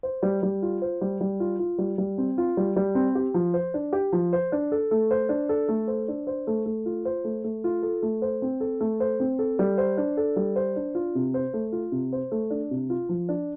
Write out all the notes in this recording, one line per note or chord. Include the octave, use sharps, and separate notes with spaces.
C5
G3
G3
F4
C5
G3
G3
F4
F4
G3
G3
C4
F4
G3
G3
C4
G4
F3
C5
D4
G4
F3
C5
D4
A4
A3
C5
D4
A4
A3
C5
D4
C5
A3
A3
F4
C5
A3
A3
F4
A4
A3
C5
C4
A4
A3
C5
C4
A4
G3
C5
D4
A4
G3
C5
D4
F4
C3
C5
A3
F4
C3
C5
A3
D4
C3
F4
F3
D4